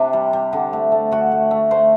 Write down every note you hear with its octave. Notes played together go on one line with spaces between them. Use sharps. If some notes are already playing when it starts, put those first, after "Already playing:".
Already playing: C3 D4
G3
G3
D3
A3
A3
D3 F#4
A3
A3
A3 C5